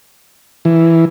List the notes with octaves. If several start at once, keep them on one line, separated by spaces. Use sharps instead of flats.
E3